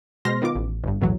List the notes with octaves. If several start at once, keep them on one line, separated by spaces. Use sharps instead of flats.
B2 G#3 C5 C6 F6 A#6
D#3 B3 F4 D6
A1
G1 G2
B1 E2 A2 E3 F#3